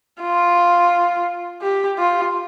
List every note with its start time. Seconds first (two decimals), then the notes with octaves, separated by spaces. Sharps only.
0.22 F4
1.62 G4
1.98 F4